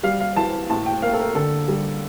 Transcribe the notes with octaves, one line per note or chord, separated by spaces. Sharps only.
G3 F5
F5
E3 A5
A2 A5
G5
A#3 F5
A4
A#4
D3 A4
G3